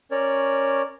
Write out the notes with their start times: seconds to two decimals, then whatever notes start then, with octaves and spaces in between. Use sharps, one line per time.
0.11 C#4 A#4 C#5 D5